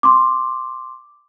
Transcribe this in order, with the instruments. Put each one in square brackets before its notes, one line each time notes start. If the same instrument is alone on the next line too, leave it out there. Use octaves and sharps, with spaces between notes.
[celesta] C6 D6